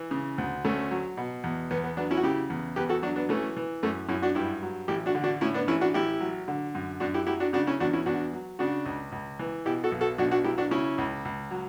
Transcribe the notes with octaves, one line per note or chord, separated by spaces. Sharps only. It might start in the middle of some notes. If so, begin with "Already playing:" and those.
Already playing: E3
C#3
D2
D2 A3 C#4
F#3
B2
E2
E2 B3
B3
F#3 B3 D4
C#4 E4
F#4
C#3 E4 G4
E2
E2 G4 B4
F#4 A4
F#3 D4 F#4
B3 D4
E3 A3 C#4
E3
F#2 A3 C#4
F#2 C#4 E4
D4 F#4
G2 E4 G4
F#3
A1 E4 G4
D4 F#4
D3
D4 F#4
A2 C#4 E4
B3 D4
A1 C#4 E4
D4 F#4
A1 E4 G4
F#3
D3
F#2
F#2 D4 F#4
E4 G4
F#3 E4 G4
D4 F#4
C#3 D4 F#4
C#4 E4
E2 D4 F#4
C#4 E4
E2 D4 F#4
F#3
C#3 D4 F#4
C#2
C#2
E3
B2 E4 G4
F#4 A4
B1
F#4 A4
B1 D4 F#4
D4 F#4
F#3 E4 G4
D4 F#4
C#3 C#4 E4
C#2
C#2
F#3